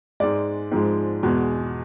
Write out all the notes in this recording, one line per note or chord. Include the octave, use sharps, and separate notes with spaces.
G#2 G#3 D5
G#2 F3 G#3
E2 B2 G#3